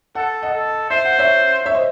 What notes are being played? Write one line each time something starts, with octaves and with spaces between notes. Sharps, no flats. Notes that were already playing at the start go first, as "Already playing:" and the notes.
A4 F#5
D#5 F#5
A4
C5 E5
F#5
C#5 E5
C#5 E5
C5 D#5